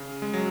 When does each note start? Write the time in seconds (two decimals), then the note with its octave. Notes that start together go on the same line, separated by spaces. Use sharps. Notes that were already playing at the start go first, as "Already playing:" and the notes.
Already playing: C#3
0.22 G#3
0.33 F#3